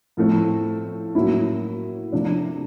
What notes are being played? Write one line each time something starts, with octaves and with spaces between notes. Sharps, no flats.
A2 F3 A3 C4
A2 F#3 A#3 C#4 E4
C3 F3 A3 D4